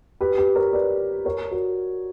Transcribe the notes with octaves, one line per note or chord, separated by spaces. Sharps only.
G4 B4
G4 B4
A#4 C#5
B4 D5
A#4 C#5
F#4 A#4